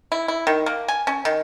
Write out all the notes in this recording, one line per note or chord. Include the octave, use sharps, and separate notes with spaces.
E4
E4
D#3
A#3
G#5
C#4
D#3